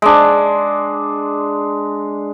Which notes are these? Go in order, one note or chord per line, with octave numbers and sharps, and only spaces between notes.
G#3 D4